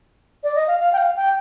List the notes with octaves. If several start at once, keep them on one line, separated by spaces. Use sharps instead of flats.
D5
D#5
F5
F5
G5
F5
G5